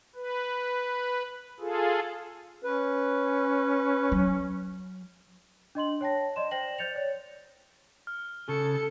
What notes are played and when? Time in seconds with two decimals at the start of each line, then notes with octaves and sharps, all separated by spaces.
0.15 B4
1.60 F4 G#4 A4
2.64 C#4 B4
4.12 F#3
5.75 D4 D#5 C6 F#7
6.01 C#5 G5 A5 A#6
6.36 D5 D#5 C6 E7
6.51 C5 D5 G5 A#6 F#7
6.78 C5 D5 G6 A6 C#7 F7
6.96 C#5
8.07 F6
8.49 C#3 A4 C#7